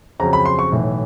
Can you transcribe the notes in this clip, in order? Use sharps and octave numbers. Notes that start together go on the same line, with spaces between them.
F2 C#3 F#3 A#5
B5
C6
C#6
B1 A2 E3